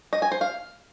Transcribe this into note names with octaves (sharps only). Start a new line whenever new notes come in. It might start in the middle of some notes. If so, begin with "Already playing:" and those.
D#5
G#5
C5
F5